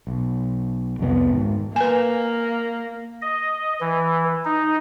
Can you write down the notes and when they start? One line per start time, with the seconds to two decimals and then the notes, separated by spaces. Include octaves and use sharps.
0.07 B1
0.99 C2 F2 E3 B3
1.33 G#2 D#3
1.76 A#3 B4 G#5
3.22 D#5
3.81 E3
4.45 D#4